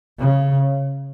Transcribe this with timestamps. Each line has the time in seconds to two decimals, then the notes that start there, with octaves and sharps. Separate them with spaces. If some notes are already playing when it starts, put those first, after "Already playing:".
0.20 C#3